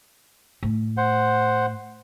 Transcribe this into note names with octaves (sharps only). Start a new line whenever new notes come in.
A2
C5 F#5